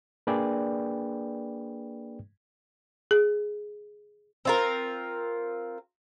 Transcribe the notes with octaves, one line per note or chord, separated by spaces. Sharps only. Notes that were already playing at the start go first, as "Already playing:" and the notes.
A#3 D4 G#4 B4 D5 G5
G#4
C4 F4 A#4